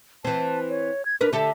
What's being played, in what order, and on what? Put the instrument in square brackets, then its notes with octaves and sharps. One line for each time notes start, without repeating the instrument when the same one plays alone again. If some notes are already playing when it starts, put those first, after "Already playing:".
[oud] E3 C4 [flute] A5
[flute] C#5
G#6
[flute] D4 [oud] A#4 B4
[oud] D3 G4 A4 [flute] E5